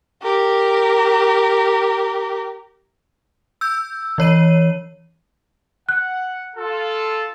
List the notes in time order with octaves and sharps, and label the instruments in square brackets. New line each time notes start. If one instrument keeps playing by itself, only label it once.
[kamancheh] G4 A#4
[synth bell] E6 G6
E3 C#5 D#7
[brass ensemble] F#5 [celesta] F#6
[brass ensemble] F4 A4